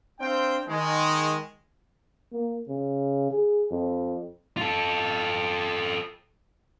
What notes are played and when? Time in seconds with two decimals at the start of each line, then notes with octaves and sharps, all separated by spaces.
0.20 C4 D4 C5 F5 G5
0.67 D#3 G#3
2.33 A#3
2.68 C#3
3.31 G#4
3.71 F2
4.57 F4 A4